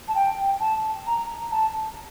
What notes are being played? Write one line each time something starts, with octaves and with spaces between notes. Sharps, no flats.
A5
G5
A5
A#5
A5